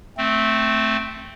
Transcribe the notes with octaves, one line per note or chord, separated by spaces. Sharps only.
A3 C4